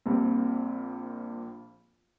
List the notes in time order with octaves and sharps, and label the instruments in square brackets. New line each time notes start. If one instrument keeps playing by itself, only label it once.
[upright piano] A#1 A#2 G3 C4